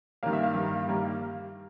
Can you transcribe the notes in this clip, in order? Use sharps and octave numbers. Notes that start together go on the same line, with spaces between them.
G2 D#3 G3 A#3 F5
E5
F5
G2 D#3 G3 A#3
G2 D#3 G3 A#3